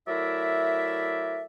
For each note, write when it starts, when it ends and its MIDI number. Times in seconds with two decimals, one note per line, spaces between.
0.08 1.43 54
0.08 1.43 57
0.08 1.43 64
0.08 1.43 70
0.08 1.43 74
0.08 1.43 76